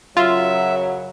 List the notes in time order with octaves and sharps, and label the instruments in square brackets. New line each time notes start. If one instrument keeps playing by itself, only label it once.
[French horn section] F#2 C#3 F#3 [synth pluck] F4 [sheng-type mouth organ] E5